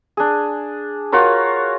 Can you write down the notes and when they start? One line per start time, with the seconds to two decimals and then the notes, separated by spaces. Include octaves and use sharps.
0.17 D4 G#4
1.12 F4 F#4 A#4 C#5